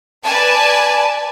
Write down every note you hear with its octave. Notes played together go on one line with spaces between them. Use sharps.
B4 D5 G#5 A5